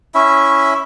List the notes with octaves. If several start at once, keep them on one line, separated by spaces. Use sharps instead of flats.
C#4 E4 E5